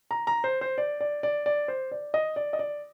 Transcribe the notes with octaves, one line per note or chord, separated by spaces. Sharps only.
A#5
A#5
C5
C5
D5
D5
D5
D5
C5
D5
D#5
D5
D#5
D5